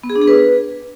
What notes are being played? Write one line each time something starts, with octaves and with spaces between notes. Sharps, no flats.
B3
G#4
D4
G#4
B4